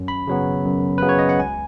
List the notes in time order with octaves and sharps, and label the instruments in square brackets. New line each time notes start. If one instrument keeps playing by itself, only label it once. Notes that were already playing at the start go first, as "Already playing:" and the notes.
Already playing: [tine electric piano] F#2
B5
C#3 F#3 B3
F#2
C#3 F#3 B3 B4
C#5
D#5
F#5
C#2 G#5